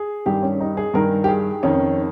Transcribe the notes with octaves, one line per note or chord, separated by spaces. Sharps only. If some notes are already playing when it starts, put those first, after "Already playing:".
Already playing: G#4
G2 D#3 G4
C#4
D#4
G#4
G2 D#3 A#4
G4
G#4
F2 D#3 C#4